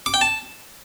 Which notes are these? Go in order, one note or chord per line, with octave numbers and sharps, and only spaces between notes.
D6
G5
A5